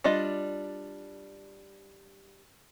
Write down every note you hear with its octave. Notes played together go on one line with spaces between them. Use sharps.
G3 D4 F4 D#5